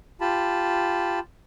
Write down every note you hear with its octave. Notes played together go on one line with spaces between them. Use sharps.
F4 G4 A5 B5